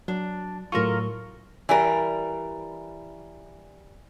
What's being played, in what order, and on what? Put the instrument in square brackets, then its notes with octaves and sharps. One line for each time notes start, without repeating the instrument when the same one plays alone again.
[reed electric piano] F#3 [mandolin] D4
[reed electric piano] A2 F#3 C#6 [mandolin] F4 A4 A#4
[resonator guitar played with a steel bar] E3 G3 A#4